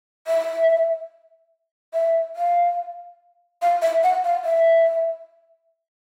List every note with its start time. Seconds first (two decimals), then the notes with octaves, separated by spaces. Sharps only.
0.27 E5
1.94 E5
2.36 F5
3.62 F5
3.82 E5
4.04 F#5
4.24 F5
4.45 E5